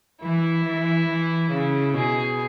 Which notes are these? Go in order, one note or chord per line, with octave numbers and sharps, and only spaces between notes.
E3 E4
E3
E3
C#3
B2 G#4